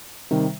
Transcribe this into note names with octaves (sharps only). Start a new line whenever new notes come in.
C3 D#3 G3